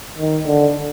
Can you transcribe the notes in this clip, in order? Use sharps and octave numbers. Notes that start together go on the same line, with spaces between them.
D#3
D3